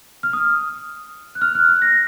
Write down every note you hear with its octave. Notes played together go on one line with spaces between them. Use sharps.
F6
D#6
F#6
F6
F#6
F#6
A#6